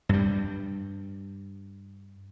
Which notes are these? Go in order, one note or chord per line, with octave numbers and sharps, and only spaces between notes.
G2 G3